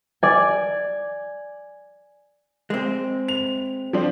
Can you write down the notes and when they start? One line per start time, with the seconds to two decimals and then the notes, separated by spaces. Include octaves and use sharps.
0.23 D5 G#5
2.70 G#3 C4
3.28 F7
3.93 F3 C4 D4